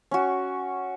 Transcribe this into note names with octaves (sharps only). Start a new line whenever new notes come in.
C#4 F#4